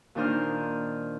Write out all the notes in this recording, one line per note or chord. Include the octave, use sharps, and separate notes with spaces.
A#2 D#3 D4 C5 D#5 F6